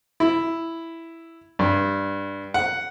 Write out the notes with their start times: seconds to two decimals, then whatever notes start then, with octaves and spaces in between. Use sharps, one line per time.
0.20 E4
1.59 G2
2.54 F#5